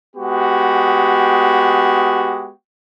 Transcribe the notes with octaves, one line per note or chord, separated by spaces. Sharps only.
G#3 B3 F#4 G4